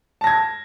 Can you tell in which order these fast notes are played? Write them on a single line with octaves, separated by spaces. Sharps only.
A5 A#6 G#6